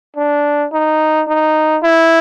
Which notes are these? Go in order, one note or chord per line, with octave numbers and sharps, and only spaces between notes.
D4
D#4
D#4
E4